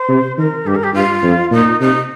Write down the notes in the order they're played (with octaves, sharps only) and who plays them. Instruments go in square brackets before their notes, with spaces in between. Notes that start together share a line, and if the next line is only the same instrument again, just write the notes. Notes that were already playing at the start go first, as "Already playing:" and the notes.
Already playing: [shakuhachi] C5
[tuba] C3
[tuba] D#3 [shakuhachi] A#4
[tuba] G2 [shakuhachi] G4
[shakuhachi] A#4
G4
[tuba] G2 [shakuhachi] F4
[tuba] F2
[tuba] A#2 [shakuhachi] D#4
[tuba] C3 [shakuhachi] D#4